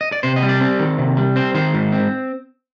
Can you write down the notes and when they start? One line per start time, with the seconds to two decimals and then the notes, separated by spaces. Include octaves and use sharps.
0.01 D#5
0.12 D5
0.23 C3 C5
0.36 D#5
0.42 G3
0.49 D5
0.61 C4
0.80 D#3
0.98 C3
1.17 G3
1.36 C4 C5
1.54 D#3 C5
1.74 G#2
1.92 C4